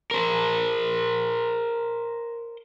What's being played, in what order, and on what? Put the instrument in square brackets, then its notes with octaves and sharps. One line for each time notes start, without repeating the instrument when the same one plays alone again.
[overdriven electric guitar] A#4 C5